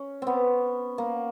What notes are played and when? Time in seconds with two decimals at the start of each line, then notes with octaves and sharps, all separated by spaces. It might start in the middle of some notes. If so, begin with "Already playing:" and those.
Already playing: C#4
0.22 B3 C4
0.98 A#3